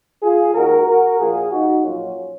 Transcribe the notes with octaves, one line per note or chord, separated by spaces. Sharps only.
F4 G#4
D#2 D#3 G#3 F#4 A#4
F#4 A#4
A#1 A#2 F3 A#3 F4 G#4
D#4 F#4
A#1 G#2 F#3 A#3 C#4 F4